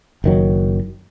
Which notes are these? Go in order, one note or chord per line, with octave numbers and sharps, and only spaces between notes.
F#1 D#3 F#3